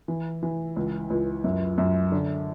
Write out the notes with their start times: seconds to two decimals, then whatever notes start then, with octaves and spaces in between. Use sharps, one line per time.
0.08 E3
0.43 E3
0.76 C#2
1.10 C#2
1.44 F#2
1.78 F#2
2.12 D3